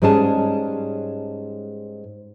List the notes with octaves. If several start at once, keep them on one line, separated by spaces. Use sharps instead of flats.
G#2 G3 G#3 C#4 G#4 A5